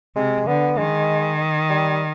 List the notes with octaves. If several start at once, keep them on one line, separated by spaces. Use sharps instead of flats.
C3 G#3
D3 B3
D#3 G#3
G3